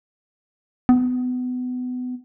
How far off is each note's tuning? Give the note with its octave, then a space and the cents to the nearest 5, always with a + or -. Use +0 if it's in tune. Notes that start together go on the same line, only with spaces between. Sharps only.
B3 +25